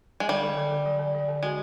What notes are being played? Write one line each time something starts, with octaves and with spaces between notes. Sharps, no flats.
G#3
D3 G3
D3
D3
D3
F#3
D3
F#3
D3
G#3 F#4